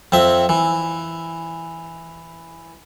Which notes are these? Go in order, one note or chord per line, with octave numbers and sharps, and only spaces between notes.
F2 C4 E5
E3